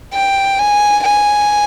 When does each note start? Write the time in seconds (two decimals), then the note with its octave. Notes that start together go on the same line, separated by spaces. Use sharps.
0.13 G5
0.59 G#5
1.05 G#5